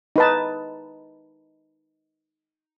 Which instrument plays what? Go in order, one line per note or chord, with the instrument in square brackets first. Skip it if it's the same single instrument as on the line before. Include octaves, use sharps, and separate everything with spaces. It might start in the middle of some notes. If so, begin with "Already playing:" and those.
[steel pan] D#4 B4 A5